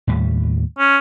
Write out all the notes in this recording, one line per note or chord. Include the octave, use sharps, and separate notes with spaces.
D#2 A2 G3
C#4